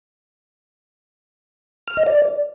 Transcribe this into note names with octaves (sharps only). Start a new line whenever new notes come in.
F6
D#5
D5